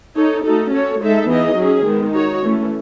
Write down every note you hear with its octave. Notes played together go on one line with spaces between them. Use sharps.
D#4 A4 C#5
A3 D#4 F#4 A4
C#4 F#4 A4 C#5
G#3 D#4 A4 E5
E3 B3 D#4 G#4 D#5
F#3 C#4 G#4
D#3 G#3 B3
D#4 F#4 C#5
E3 A3 C#4